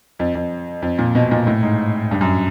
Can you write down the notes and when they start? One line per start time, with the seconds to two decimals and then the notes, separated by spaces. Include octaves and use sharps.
0.19 F2
0.35 F2
0.82 F2
0.98 A#2
1.15 B2
1.31 A#2
1.47 A2
1.63 G#2
2.11 G2
2.21 F#2